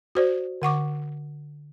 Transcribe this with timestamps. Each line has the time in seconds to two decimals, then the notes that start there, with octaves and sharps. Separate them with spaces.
0.15 F#4 C5 D5
0.62 D3 F#5 C#6 D6